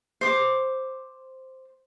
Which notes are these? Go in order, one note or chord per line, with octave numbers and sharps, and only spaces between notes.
C5 D6